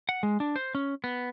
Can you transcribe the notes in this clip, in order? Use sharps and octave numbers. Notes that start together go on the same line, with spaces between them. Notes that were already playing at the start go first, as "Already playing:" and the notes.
F#5
G#3
D4
C5
C#4
B3